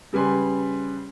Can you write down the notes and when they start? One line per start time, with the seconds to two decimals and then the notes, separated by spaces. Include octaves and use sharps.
0.13 C#3 G3 B4 G#5 C6